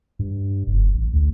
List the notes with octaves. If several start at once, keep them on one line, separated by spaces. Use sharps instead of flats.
G2
F#1
A1
D2